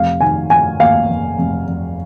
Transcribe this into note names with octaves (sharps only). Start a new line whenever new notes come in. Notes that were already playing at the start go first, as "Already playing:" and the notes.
Already playing: F1 F5
D#3 G#5
F1 G#5
D#2 F5
F1
F1
F1